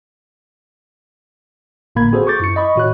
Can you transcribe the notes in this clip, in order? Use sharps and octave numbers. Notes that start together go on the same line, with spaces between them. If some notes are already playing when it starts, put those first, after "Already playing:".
G#1 A2 D3 A#3 B5 G#6
C4 F#4 G#4 A4 B4 C5
C#6 D6 G6 A6
F#2 E4 C#7
D#5 B5 C#6
A2 D#3 F#4 C#5 F#6